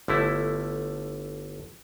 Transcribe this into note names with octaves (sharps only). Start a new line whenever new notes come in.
G1 D3 A3 E4